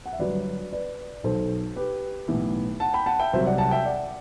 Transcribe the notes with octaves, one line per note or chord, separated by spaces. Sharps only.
F#5
E5
G1 G2 F#3 B4 D5
B4 D5
B1 B2 F#3 A4 C5
G4 B4
B1 A2 E3 B3
F#5 A5
G5 B5
F#5 A5
E5 G5
C2 C3 F#3 C5 E5
D5 F#5
F#5 A5
E5 G5
D5 F#5